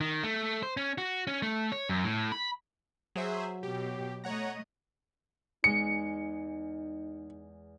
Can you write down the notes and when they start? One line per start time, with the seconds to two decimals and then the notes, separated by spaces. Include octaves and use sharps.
0.01 D#3
0.24 A3
0.63 C5
0.77 C#4
0.98 F#4
1.27 C#4
1.42 A3
1.72 C#5
1.89 F#2
2.04 A2
2.32 B5
3.16 F#3 G#4 C5 E5
3.63 B2 G4
4.24 A3 C#5 D#5 F#5 A#5
5.64 E2 G#3 D#4 C#7